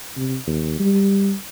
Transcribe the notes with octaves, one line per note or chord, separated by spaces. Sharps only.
C3
D#2
G3